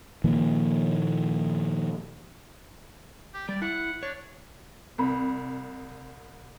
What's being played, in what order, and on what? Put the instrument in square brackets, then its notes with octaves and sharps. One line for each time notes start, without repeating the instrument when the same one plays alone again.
[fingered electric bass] A#2 D#3 F3 A#3
[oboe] G4
[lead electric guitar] G3 [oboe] D5
[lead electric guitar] E4 [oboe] F#5
[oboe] D4 [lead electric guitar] C#5
[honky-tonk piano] C2 B5